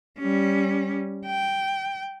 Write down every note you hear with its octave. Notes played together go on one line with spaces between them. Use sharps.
G3 C#4
G5